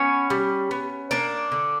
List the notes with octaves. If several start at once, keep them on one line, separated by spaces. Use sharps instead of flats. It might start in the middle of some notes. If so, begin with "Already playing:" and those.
Already playing: B3 C#4 C#5
G3
B3
A#3 D4 D5
D3